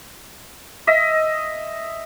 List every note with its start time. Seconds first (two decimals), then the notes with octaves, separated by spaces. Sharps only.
0.87 D#5 E5